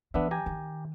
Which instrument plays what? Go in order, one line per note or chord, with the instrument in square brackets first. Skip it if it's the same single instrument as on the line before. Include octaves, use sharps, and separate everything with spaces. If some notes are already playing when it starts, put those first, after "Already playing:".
[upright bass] E3 [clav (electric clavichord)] B3 D4 E5
[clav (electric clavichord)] G4 G#5 A#5
[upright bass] D#3